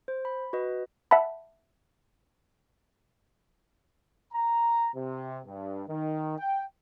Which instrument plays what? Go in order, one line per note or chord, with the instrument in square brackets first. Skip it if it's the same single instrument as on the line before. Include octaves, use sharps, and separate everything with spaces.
[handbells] C5
B5
F#4 B4 D#5
E5 F#5 A5 B5
[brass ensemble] A#5
C3
G2
D#3
G5